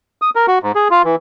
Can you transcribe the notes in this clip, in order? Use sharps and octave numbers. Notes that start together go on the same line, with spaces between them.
D#6
A#4
F#4
G#2
G#4
F4
E3